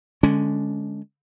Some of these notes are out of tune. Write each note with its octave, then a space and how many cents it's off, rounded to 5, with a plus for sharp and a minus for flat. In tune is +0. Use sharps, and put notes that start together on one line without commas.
D3 +0 G#3 +0 C#4 +15